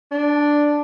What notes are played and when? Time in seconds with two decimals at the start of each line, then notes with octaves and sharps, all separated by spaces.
0.11 D4